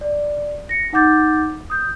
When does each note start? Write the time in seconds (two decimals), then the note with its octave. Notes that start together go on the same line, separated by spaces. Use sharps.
0.01 D5
0.69 A#6 C#7
0.93 D#4 F#5 D6 G6 A6
1.70 D#6 G6